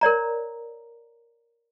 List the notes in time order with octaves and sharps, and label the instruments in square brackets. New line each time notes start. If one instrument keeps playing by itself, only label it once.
[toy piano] A#4 C#5 D5 A#5